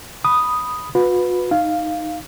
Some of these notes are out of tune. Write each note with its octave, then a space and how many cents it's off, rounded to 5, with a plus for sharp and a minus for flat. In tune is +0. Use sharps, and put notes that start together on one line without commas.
B5 -5 D#6 +0
F#4 -45 B4 +0 B5 +0
D#4 +0 F5 +0